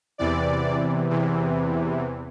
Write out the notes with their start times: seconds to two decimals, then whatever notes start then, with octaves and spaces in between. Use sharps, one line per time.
0.18 E2 C3 E3 D5
1.10 E2 C3 E3